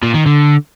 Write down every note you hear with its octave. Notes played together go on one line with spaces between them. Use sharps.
A#2
D#3
D3